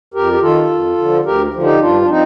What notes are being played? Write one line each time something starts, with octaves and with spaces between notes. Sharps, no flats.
F2 G4 A#4
G4
D#3 F4 A4
F2
D3 F3
D2 G4 A#4
D3 F3
D#4 G4
G2 D4 F4
D4
F3 C4 D#4